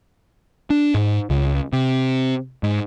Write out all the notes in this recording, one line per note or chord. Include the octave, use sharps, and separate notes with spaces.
D4
G#2
C#2
C3
G#2